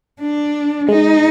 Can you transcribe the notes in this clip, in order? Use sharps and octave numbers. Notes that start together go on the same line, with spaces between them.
D4
G#3 D#4